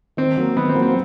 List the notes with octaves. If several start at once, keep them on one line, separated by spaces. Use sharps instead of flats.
D#3 C4
F#3 A#3
D#3 B3
C4
F#3 A#3
C4